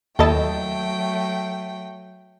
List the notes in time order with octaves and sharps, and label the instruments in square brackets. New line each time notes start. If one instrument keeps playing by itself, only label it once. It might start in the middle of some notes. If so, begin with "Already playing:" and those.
[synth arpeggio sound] D#2 E4 A5 [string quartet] F#3 A3 G5 [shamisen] A4 D#5